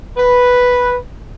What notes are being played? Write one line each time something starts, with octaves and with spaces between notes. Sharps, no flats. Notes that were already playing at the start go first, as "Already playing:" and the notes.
B4